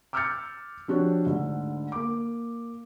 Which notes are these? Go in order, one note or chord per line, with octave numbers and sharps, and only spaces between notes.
D6 E6 F6 G6 A6 C#7
F3 D4 F#4 G4 C#5
D2 G#2 D3
A#3 D6